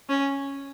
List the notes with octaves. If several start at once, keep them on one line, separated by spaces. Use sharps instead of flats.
C#4